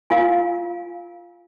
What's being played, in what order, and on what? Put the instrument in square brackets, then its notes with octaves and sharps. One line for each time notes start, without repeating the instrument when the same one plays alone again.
[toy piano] F4 A#4 F5 G#5